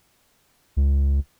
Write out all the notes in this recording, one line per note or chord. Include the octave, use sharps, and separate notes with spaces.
C#2